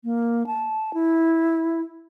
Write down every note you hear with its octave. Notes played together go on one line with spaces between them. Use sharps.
A#3
A5
E4